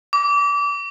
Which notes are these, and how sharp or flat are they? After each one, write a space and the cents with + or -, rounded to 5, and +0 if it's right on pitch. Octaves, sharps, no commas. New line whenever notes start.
D6 -30